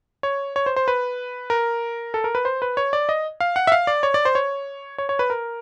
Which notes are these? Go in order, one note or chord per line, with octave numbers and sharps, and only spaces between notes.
C#5
C#5
C5
C5
B4
A#4
A4
A#4
B4
C5
B4
C#5
D5
D#5
F5
F#5
E5
F5
D5
C#5
D5
C5
C#5
C#5
C#5
B4
A#4